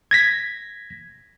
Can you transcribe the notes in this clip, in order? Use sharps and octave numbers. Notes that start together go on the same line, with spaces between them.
G#6 A#6 B6